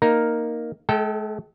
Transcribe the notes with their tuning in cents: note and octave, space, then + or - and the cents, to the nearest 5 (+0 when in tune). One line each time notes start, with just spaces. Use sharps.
A#3 +0 D#4 +0 A#4 +0
G#3 +45 A4 +0 G5 -15